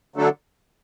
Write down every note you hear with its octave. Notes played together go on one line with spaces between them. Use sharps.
D3 F#3 A3 D4 A4